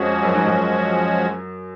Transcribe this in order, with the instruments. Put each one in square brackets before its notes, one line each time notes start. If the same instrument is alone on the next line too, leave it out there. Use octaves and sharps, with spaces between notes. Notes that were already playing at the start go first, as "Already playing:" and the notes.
Already playing: [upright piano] F2 [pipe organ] F3 G#3 C#4 F#4
[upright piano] F#2
G#2
F#2